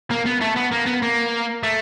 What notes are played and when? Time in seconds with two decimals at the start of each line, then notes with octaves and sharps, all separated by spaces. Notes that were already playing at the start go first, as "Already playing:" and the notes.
0.11 A#3
0.26 B3
0.42 A3
0.57 B3
0.72 A#3
0.87 B3
1.03 A#3
1.63 A3